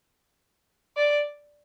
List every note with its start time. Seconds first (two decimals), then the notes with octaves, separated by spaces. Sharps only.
0.97 D5